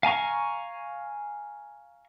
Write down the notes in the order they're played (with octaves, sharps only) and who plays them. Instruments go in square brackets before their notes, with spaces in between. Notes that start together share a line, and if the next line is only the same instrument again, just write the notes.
[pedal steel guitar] F5 G#5 A#5 C#6